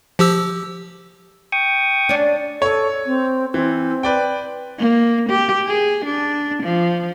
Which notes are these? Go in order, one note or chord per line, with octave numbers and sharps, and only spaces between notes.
F3 G4 E6
G5 C#6 D#6
C#4 D4
A4 C#5 C#6
C4
E3 C4
B4 D5 G5
A#3
G4
G#4
D4
F3